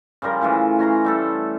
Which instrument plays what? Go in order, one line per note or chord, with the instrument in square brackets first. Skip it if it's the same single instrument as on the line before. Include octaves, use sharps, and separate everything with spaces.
[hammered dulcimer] C#3 F3 G3 A#4
A2 C#3 E3 F4
C#4 A#5 C6
G3 A3 A4